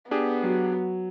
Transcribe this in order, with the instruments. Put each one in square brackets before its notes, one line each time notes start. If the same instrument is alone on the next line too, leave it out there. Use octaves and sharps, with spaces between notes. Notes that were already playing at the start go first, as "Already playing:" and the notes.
[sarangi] B3 [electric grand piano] D4 G4 G#4
[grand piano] F#3